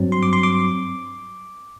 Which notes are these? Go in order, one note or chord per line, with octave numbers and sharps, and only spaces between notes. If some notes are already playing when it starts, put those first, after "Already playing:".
Already playing: G2 F#3 C4
C6
D6
C6
D6